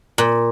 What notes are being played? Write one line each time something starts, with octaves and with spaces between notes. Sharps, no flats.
A#2